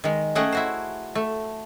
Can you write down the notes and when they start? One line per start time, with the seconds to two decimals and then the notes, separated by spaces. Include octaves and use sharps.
0.04 D#3 G#3
0.35 A3 C#4 G#4 D#5 F#5 G5
0.52 E4 F#4 C5
1.15 A3